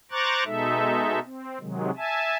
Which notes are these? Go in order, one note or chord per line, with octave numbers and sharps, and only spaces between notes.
C5 A#5 C#6 D6 F#6 A6
B2 G#3 D#4 A4 E5
C4
C3 D#3 F#3 G#3
E5 G#5 A5